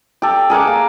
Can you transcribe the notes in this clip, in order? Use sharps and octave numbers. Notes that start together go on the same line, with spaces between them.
G4 A4
G#4 A#4 F#5 D6
A#3